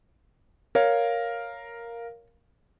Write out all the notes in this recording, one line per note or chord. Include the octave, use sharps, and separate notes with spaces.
A#4 C#5 F5